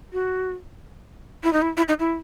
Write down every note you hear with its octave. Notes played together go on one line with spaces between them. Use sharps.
F#4
E4
D#4
E4
E4
D#4
E4